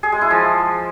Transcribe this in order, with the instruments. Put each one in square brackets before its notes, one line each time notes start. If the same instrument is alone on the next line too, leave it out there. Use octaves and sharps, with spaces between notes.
[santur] G#4
G#3
E4
F3